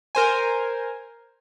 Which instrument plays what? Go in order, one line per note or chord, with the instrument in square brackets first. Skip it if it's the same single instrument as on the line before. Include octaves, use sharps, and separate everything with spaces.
[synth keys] A#4 C5 G#5